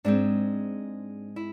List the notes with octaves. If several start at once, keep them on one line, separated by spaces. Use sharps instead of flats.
G#2 G#3 C4 D4
E4